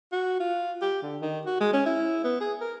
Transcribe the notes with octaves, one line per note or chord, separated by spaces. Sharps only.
F#4
F4
G4
D3
D#3
F#4
G#3
C#4
E4
B3
G#4
A#4